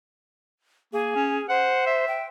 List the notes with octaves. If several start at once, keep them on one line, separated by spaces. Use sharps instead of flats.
A#3 G#4
C#4
C5 F#5
E5
G5